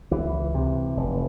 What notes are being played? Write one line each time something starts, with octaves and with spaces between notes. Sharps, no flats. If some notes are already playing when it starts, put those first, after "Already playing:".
C#2 E3
C3
F1